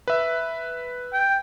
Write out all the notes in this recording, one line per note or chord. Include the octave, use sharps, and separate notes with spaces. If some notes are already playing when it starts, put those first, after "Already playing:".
B4 E5
G5